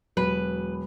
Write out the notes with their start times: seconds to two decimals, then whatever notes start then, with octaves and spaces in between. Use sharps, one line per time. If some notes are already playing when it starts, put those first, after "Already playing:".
0.17 E1 F#3 B4